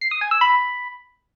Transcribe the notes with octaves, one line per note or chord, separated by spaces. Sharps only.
C7
D#6
G#5
E6
B5